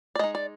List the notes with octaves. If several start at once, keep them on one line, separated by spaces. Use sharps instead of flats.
D5
G#3 D#4 D#5
D5